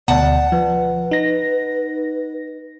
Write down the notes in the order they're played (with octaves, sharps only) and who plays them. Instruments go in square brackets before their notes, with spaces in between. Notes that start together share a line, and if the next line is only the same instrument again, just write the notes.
[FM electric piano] D2 B2 [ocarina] D5 [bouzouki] F#5 A5
[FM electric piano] F3 [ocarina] B4
[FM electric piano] D#4 A#6